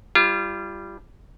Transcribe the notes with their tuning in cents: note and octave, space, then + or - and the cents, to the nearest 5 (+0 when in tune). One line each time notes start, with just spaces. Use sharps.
G3 +0 F4 -30